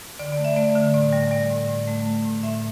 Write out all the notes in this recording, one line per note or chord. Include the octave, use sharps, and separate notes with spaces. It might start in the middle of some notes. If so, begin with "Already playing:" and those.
D3 D5
D5
A3
E5
A3 D5
D3
A2 D5
G3
G3 D5
A2
A2
A3
A3
A2
A2 E5